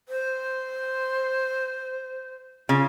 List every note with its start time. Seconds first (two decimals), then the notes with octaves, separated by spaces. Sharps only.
0.09 C5
2.69 C#3 F4